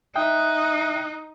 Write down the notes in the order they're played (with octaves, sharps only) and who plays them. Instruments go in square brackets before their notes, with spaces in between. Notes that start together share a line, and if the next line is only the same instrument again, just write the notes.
[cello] D#4 [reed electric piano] E5 G5 D#6 [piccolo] F#6